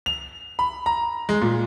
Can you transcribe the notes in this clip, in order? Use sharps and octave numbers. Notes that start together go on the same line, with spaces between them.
F7
B5
A#5
G#3
A#2